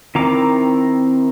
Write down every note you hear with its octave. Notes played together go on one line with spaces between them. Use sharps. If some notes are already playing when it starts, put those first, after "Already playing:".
D#3 C4 E4 A#5 D6